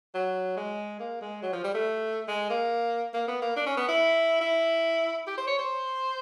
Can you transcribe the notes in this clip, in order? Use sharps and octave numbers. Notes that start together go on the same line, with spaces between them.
F#3
G#3
A#3
G#3
F#3
F3
G3
A3
G#3
A#3
A#3
B3
A#3
D4
C#4
B3
E4
E4
G4
C5
C#5
C5